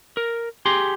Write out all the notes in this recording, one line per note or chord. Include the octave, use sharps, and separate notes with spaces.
A#4
G4 G#4 C6